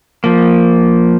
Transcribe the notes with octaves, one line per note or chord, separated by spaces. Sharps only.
F3 A#3